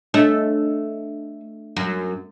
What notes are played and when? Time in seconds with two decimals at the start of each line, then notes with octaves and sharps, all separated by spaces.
0.14 A3 D4 C#5 D#5
1.76 F#2